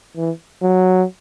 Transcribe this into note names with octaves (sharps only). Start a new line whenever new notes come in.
E3
F#3